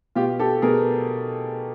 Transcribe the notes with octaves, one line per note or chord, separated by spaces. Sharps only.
B2 F4 G4
G4 A4
B2 G#4 A#4